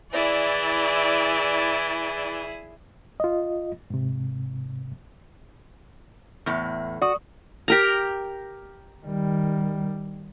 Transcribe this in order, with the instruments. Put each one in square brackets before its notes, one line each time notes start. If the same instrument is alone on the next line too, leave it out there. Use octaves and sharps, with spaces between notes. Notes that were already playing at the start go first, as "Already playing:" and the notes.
[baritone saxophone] E3 [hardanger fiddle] E4 G#4 [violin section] D5
[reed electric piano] F4 D#5
G#2 C3
[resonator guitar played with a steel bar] E2 A2
[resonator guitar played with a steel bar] F#4 [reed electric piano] D5 D#6
[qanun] G4 A#4 A#5
[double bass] D#3 G3